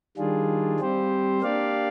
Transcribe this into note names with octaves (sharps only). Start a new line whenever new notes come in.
D#3 G3 D4 F4 G#4
G3 C4 G4 C5
A#3 D4 G4 D5 F5